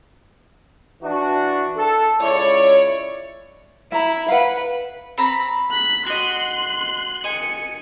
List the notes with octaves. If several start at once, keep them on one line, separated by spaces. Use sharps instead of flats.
E3 D4 F#4
A4
C#2 E4 C#5 D5
E4 E5 A#5
B4 F5 F#5
C4 A#5 B5
F#6 B6
F#4 D#5 C6 F#6
D#5 G#5 C#7